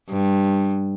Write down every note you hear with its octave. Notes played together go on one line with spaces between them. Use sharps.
G2